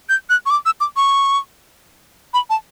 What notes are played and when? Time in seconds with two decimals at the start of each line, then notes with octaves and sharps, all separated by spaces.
0.09 G6
0.30 F#6
0.46 C#6
0.50 D6
0.66 E6
0.81 D6
0.96 C#6
2.34 B5
2.50 A5